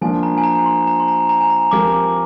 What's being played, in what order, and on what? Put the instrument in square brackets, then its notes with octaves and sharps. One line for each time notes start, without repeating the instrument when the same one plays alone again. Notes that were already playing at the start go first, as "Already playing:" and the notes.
[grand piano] F3 A#3 D4 [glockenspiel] G#5
[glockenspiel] A#5
G#5
A#5
C6
A#5
C6
A#5
A#5
G#5
A#5
[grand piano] F3 C4 G4 A#4 [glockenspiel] D6
[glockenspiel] D6